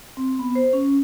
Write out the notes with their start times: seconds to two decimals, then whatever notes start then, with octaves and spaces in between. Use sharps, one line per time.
0.17 C4
0.39 B3
0.55 C5
0.73 C#4